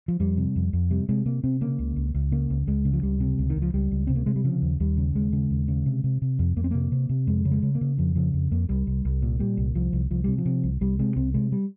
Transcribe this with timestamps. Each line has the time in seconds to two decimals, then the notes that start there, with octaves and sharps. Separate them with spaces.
0.08 F3
0.20 F2 G3
0.37 C3
0.56 F2
0.73 F2
0.91 C3 G3
1.09 C3 G#3
1.26 C3 A#3
1.44 C3 C4
1.61 C#3 A#3
1.79 C#2
1.96 C#2
2.14 C#2
2.32 C#3 A#3
2.50 C#2
2.67 C#2 G#3
2.85 C#3
2.93 F3
3.03 C#2 G3
3.20 C3
3.38 C#2
3.50 D#3
3.56 C#2
3.62 F3
3.74 C#2 G3
3.91 C#2
4.07 C3 C4
4.16 A#3
4.26 C3 G#3
4.36 G3
4.44 C#3 F3
4.62 D#2
4.80 D#2 G3
4.97 C#3
5.15 D#2 G#3
5.33 C#3
5.50 D#2
5.68 C#3
5.86 C3
6.04 C3
6.22 C3
6.39 F2
6.56 F2 A#3
6.64 C4
6.71 C3 A#3
6.92 C3
7.09 C3
7.27 F2 G#3
7.45 C#3
7.51 G#3
7.62 C#3
7.75 A#3
7.81 C#3
7.98 F2 F3
8.15 C#3 F3
8.34 F2
8.51 F2 A#3
8.69 C2 G3
8.87 C2
9.05 C2
9.22 A#2
9.39 A#2 G3
9.57 C2
9.75 C2 F3
9.93 C2
10.10 C2 F3
10.24 C3 G3
10.38 F3
10.45 C3
10.64 C2
10.81 C2 G3
10.99 C3 G#3
11.16 C2 C4
11.34 C3 G#3
11.52 G3